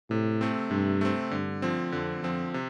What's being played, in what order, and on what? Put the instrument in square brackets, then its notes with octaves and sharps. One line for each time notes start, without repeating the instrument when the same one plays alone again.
[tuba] A2 [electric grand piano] C3
[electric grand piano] A3 C4
[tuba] G2 [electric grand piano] C3
[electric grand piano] A3 C4
[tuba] G2 [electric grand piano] D3
[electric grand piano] F3 C4
[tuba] F2 [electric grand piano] D3
[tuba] F2 [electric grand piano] F3 C4
[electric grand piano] C3